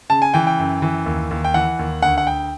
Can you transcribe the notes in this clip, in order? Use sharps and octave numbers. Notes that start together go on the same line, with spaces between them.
C#3 A5
G#5
E3 G5
G5
F#2
E3
D#2
D#2
G5
E3 F#5
D#2
D2 F#5
F#5
D2 G5